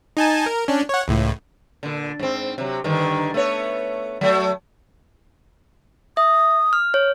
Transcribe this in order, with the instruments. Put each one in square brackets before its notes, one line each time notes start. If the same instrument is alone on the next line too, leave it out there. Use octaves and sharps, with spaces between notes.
[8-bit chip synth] D#4 G#5 A5
A#4
C#4 D4
C#5 F#5
C#2 A2
[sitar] A#2 D3
G#2 C4
C3 F#3
G2 D3 D#3
A3 B3 C#5
F#3 A3
[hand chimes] E5 [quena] D#6
[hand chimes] F6
C#5